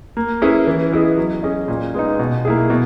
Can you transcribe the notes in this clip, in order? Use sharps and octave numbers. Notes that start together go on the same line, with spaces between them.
A#3
C#4 E4 G#4 B4
E3
B3 E4 G#4 D#5
F#3
C#4 G#4 D#5
A#2
G#3 B3 D#4
B2
A#3 E4 G#4
B2